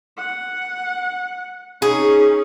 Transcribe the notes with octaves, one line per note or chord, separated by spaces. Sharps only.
F#5
C#4 D#4 G#4